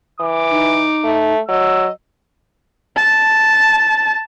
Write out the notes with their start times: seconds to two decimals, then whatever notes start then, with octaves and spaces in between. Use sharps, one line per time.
0.20 E3 D6
0.51 D#4
1.04 A3
1.49 F#3 D#5 E6
2.97 A5